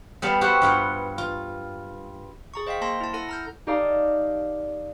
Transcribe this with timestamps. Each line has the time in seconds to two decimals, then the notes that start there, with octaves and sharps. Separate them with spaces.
0.22 G3 B3 F5 A5
0.41 F#4 G4 B4 C5 E5 F#5
0.62 G2 F4 F#5 G5
1.18 F4
2.54 G#4 A#5 C#6
2.67 C5 D#5 F5 G5 B6
2.81 A#3 C5 A5 C6 A#6
3.01 E4 A5
3.13 E4 A4 F#5 A#6
3.29 A#5 F6 G6
3.67 D#4 G4 A4 D5 F5 A#5